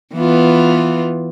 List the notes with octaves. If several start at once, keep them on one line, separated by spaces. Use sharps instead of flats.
E3 B3 F4